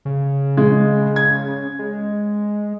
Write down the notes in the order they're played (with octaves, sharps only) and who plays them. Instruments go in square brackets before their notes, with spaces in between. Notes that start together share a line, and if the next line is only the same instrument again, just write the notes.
[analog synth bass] C#3
[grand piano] G#3
G#6
[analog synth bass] G#3